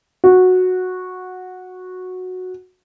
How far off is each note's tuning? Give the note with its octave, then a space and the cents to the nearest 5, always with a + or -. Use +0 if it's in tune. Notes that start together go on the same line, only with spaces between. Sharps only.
F#4 -10